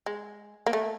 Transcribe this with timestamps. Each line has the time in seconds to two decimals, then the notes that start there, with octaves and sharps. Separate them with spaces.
0.06 G#3
0.66 A#3
0.73 A3